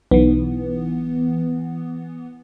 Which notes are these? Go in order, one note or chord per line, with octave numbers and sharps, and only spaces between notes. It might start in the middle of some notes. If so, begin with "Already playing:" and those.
B1 E3 B3